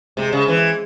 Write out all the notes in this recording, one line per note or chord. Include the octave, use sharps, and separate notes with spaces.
C3 G#3
C#3
E3